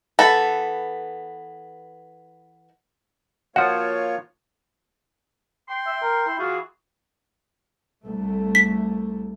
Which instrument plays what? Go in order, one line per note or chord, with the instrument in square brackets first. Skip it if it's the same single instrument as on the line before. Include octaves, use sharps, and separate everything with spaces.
[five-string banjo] E3 B3 A4
[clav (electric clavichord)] F3 F#4 [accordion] A#3 F4 C#5 [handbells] F#5
[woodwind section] G5 C6
[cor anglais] E5
A#4
E4
[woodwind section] E3 F4 G#4 [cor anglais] F#4
[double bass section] C2 A3
[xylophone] B6